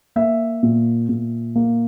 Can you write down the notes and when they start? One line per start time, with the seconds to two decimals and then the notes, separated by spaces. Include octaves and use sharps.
0.16 A#3 E5
0.63 A#2
1.09 A#2
1.56 A#3